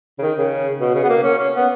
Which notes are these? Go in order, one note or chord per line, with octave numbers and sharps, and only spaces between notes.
C#3
D#3
C#3
B2
C#3
B3
A#3
C#4
C#4
B3